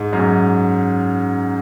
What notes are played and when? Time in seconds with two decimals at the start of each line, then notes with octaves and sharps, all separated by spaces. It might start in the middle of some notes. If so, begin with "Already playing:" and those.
Already playing: G#2
0.13 F#2
0.19 G#2